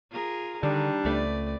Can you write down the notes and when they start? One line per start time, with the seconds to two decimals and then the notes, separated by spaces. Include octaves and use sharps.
0.11 F4 G#4 A#4
0.63 D3 D#3 G3 D4
1.05 C#2 A3 C4 B4 D5